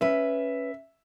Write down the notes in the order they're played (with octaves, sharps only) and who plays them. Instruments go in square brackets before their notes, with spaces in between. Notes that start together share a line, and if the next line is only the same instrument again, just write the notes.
[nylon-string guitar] C#4 B4 [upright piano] E5